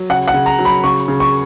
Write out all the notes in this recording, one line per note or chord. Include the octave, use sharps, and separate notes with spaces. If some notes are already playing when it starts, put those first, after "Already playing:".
Already playing: F#3
C#3 F#5
F#5
C#3
A#5
F#3
B5
C#3 C#6
C#3
C#6